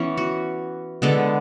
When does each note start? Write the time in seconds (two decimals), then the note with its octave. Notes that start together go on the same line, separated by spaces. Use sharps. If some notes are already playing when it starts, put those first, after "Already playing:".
Already playing: E3 B3 C#4
0.18 F#4
1.02 D3 G#3 B3 A4